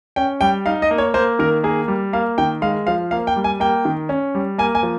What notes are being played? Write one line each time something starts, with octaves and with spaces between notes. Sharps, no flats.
C#4 G5
G3 G5
D#4 F5
D#5
A#3
C#5
A#3 C5
D#3 A#4
A#3 G#4
G3
A#3 F5
D#3 G5
G#3 F5
F3 F5
A#3 F5
G5
G3
G#5
A#3 G5
D#3
C#4
G3
A#3 G#5
G#5
F3